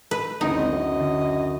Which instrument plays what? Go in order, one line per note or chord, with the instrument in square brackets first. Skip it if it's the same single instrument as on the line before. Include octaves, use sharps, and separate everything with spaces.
[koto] B4
[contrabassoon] F#1 [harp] D2 E4 D#7 [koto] D#4 [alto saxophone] D#5
[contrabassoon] G#1
F#2
[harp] D3 D4